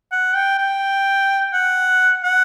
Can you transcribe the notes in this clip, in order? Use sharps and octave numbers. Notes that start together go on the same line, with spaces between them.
F#5
G5
G5
F#5
F#5